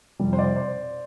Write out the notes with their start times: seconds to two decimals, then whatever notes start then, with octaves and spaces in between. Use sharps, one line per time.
0.19 F2 C3 G3
0.33 C5
0.39 D5
0.56 C5